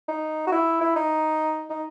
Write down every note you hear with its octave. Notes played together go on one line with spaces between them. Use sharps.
D#4
F#4
E4
E4
D#4
D#4